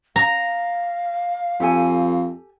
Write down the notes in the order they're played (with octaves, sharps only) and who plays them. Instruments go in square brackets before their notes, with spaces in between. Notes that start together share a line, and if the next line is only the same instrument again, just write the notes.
[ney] F5 [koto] A#5
[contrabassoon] F2 [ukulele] G4 A4 G#5